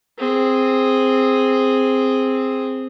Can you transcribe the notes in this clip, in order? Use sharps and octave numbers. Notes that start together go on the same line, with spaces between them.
C4 G#4